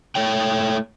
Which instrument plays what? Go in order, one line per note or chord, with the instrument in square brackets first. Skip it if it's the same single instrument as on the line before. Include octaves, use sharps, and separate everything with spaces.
[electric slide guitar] A3 C#5 G5